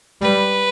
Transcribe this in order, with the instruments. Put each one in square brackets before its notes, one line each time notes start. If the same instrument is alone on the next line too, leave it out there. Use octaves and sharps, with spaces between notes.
[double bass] G3 [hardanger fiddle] B4